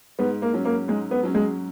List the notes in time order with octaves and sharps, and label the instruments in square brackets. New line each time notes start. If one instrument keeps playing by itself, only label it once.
[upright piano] G#2 [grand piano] B3
[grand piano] A#3
[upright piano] F#3 C#4
[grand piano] A#3
[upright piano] G#2 [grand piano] G#3
[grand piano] B3
[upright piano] F#3 C#4
[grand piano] G#3